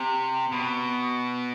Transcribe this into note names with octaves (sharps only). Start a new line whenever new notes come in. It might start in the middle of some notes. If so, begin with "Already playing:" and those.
Already playing: C3
B2